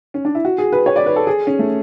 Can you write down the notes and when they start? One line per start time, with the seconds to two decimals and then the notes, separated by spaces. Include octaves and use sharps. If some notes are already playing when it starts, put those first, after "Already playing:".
0.14 C#4
0.25 D4
0.35 E4
0.45 F#4
0.58 G#4
0.72 B4
0.86 C#5
0.96 D5
1.06 B4
1.16 A4
1.27 G#4
1.47 C#4
1.59 A3